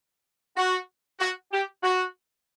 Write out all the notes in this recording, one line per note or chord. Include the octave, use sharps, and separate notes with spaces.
F#4
F#4
G4
F#4